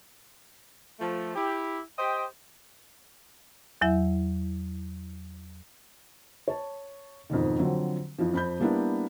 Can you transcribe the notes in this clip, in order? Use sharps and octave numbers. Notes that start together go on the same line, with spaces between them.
F3 A3
E4 G4
G4 C5 D#5 G5
E2 F#3 E4 E5
C#5 A5
F2 G#2 B2 D#3
D3 F3 F#3 C4
F2 E3 F3
F2 B5 G6
G3 A#3 B3 D4 E4